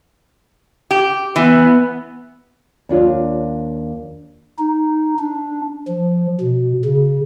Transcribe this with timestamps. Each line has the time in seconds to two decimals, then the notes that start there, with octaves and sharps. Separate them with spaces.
0.91 G4
1.36 E3 B3
2.89 D#2 D4 F4 C#5
4.59 D#4
5.19 D4
5.88 F3
6.41 B2
6.85 C#3